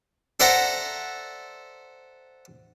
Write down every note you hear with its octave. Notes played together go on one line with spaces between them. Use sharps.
A4 C5 D5 E5 F#5 A#5